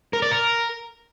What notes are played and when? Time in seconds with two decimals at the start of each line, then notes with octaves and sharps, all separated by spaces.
0.13 A#4
0.22 D5
0.31 A#4